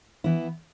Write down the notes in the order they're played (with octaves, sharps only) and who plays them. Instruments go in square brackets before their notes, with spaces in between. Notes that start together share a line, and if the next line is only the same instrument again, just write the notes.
[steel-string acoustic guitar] E3 B3 E4